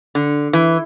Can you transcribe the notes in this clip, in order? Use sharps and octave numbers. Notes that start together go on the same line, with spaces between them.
D3
E3